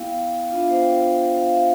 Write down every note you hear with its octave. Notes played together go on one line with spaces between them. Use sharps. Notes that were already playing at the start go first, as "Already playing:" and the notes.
Already playing: B3 E4 F5 G5
B3 D4 F4 F5
E5
C5
G5
F5
E5